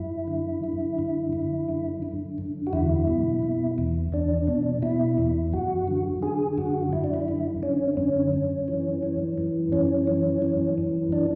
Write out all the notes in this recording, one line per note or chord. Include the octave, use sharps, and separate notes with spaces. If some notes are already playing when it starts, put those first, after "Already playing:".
Already playing: F#2 E4
D3
D3
F#2
F#2
D3
D3
F#2
F#4
E2 E4
B2
B2
E2
E2 D4
B2
B2 E4
E2
F#2 F#4
D3
D3 G#4
F#2 F#4
F#2 E4
D4
E4
D3
D3 C#4
F#2 C#4
F#2
E3
E3
F#2
F#2 C#4
E3
E3
F#2
D4